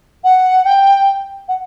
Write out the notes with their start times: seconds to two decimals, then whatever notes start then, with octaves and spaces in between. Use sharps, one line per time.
0.23 F#5
0.65 G5
1.48 F#5